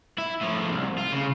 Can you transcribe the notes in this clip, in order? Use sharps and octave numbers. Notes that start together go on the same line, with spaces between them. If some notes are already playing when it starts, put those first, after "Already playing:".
E4
A2 F3
C2
F4
C#3